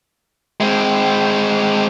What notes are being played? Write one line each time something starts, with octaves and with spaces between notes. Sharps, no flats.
G#3 C4